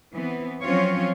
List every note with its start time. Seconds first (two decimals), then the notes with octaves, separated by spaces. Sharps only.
0.14 E3 B3 C4
0.62 F3 F#3 C4 C#4 F4 C#5